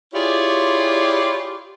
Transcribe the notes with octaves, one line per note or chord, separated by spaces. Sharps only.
E4 F4 G4 G#4 C#5 D5